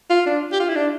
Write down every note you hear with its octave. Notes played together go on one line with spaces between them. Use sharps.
F4
D4
G4
F4
E4
D4